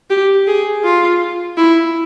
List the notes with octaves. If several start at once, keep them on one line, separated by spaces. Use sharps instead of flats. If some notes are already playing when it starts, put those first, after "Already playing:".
G4
G#4
F4
E4